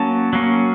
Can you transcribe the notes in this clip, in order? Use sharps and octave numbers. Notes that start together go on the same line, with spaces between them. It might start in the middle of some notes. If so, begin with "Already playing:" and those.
Already playing: F#3 A#3 C#4 A5
F#3 A#3 C#4